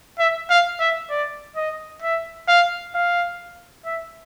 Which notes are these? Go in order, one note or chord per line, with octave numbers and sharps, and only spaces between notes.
E5
F5
E5
D5
D#5
E5
F5
F5
E5